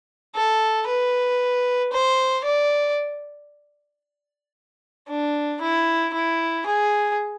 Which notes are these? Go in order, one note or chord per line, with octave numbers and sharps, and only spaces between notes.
A4
B4
C5
D5
D4
E4
E4
G#4